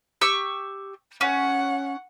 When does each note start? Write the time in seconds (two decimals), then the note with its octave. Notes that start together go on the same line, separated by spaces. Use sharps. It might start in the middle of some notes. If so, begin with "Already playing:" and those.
0.21 G4 C#6 E6
1.21 C#4 F#5